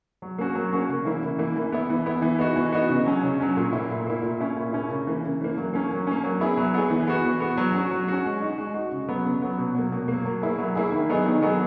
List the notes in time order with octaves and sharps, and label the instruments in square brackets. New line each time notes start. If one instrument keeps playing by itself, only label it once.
[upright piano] F#3
A#3 C#4 F#4
F#3
A#3 C#4 F#4
C#3
E3 A#3 E4
C#3
E3 A#3 E4
E3
B3 E4
E3
B3 E4
E3
B3 D#4 F#4
E3
B3 D#4 F#4
C#3
F#3 C#4
C#3
F#3 C#4
A#2
A#3 E4
A#2
A#3 E4
A#2
A#3 C#4 E4
A#2
A#3 C#4 E4
C#3
E3 A#3
C#3
E3 A#3
F#3
A#3 C#4
F#3
A#3 C#4
F#3
B3 E4 G#4
F#3
B3 E4 G#4
E3
B3 F#4
E3
B3 F#4
F#3
C#4 F#4
F#3
C#4 F#4
G#3
D#4 F#4
G#3
D#4 F#4
C#3
F#3 B3
C#3
F#3 B3
B2
F#3 A#3
B2
A#3
F#3
F#3
A#3 E4 G#4
F#3
A#3 E4 G#4
D#3
F#3 B3 D#4 G#4
D#3
F#3 B3 D#4 G#4